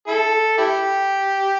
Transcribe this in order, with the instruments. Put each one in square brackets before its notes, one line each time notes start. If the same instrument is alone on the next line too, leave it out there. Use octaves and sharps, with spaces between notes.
[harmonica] E4 A4
E4 G4